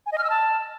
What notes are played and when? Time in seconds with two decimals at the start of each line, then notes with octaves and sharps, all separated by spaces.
0.06 G#5
0.12 D#5
0.18 F6
0.24 E6
0.30 A5